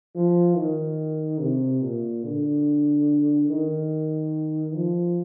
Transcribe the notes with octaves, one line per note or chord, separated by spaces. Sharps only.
F3
D#3
C3
A#2
D3
D#3
F3